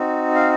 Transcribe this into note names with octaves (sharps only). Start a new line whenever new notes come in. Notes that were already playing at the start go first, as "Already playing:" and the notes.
Already playing: C4 D#4 F#4
F5